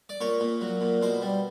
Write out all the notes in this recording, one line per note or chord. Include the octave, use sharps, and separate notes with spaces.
D5
A#2 C#5
A#2
F#3
A#2
B2 C5
G3